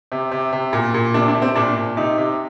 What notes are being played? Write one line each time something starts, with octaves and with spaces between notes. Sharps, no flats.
C3
C3
C3
A#2
A#2
C3 D4
D4
C3
C4
A#2 D4
A#2
C3 D#4
C3